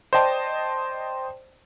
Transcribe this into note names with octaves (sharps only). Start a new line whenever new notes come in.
C5 D5 D#5 G5 A5